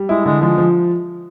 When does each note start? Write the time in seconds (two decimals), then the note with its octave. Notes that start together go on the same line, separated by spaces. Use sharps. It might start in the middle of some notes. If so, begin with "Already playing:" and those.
Already playing: G3
0.09 G#3 E4
0.25 D3 G#3
0.41 F3 G#3
0.58 F3